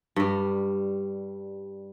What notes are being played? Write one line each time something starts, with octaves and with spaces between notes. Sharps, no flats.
G2 G3